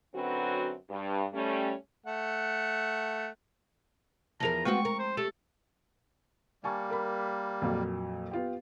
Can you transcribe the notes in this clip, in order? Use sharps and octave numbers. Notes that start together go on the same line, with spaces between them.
F#2 D3 F#3 C4 F#4 B4
G2
G3 A3 C#4
A3 F#5
E2 F3 G#4 A#4 A5 A#5
G#3 A3 B3 C4 F#4 C#6
A#4
C5
A3 G4 A4
G3 A#3 G#5 A5 C#6
A#4 B5
F2 A#2 F#3
B3 F4 G4